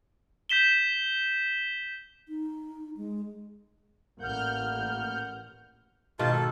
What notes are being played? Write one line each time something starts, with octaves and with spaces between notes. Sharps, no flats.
G6 B6 E7 G7
D#4
G#3
A1 A#3 F#5 F6 G6
G#2 B2 D#3 F4 A5
A4